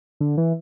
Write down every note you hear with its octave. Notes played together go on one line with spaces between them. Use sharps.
D3
E3